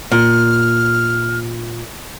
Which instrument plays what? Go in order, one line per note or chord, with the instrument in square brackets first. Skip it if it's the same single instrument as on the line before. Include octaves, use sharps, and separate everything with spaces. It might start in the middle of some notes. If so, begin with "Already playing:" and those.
[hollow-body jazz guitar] A#2 [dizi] F6